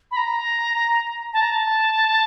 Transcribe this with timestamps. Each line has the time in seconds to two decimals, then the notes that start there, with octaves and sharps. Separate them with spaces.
0.11 B5
0.17 A#5
1.33 A5
1.41 A#5
1.51 A5